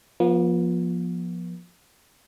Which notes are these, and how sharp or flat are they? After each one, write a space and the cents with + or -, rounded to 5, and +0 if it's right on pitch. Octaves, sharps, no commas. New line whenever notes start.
F3 +5 B3 -45